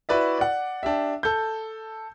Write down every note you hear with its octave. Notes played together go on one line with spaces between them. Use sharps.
E4 F#4 B4 D5 E5
D5 F#5
D4 G4 E5
A4 G6